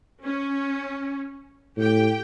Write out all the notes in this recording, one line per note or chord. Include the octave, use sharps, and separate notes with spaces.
C#4
A2 G4 G5